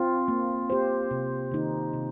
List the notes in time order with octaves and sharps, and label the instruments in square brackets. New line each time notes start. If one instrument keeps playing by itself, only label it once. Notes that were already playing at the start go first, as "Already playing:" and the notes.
Already playing: [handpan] C4 F4
A#3
G4 C5
C3
D#3 A#3 D#4
C3